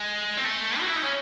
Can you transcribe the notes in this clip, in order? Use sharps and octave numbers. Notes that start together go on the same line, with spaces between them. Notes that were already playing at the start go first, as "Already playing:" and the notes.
Already playing: G#3
C4
A3
F#4
E4
D#4
C#4